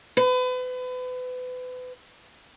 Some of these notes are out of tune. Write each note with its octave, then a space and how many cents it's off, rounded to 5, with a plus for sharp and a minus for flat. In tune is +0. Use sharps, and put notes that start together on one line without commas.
B4 +35